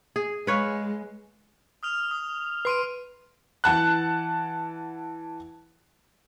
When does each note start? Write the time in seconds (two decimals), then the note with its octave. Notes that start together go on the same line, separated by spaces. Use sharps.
0.16 G#4
0.47 G#3 B4 C#5 F5
1.83 D#6 F6 F7
2.11 D#6
2.65 B4 C6 C7 D7 D#7
3.64 E3 F#5 A5 F#6